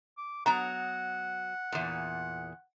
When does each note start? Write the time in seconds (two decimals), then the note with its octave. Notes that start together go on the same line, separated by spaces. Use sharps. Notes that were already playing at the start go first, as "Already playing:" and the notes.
0.18 D6
0.46 F#3 B3 F#5 A#5
1.72 E2 A#2